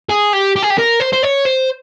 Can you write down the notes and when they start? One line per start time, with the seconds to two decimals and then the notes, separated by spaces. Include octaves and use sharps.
0.09 G#4
0.33 G4
0.56 G4
0.63 G#4
0.70 G4
0.78 A#4
1.00 C5
1.13 C5
1.23 C#5
1.46 C5